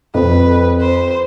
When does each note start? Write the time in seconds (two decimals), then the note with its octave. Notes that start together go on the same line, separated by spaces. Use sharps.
0.14 F2 B4
0.80 C5